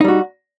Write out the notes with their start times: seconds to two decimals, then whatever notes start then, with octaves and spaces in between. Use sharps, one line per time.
0.01 D#4
0.04 G3
0.08 F#4